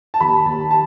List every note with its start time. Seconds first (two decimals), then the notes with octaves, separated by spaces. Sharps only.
0.14 A5
0.20 D#2 B5
0.46 D#2 A5
0.71 A5